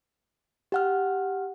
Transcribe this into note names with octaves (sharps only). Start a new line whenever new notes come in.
G4 F#5 F6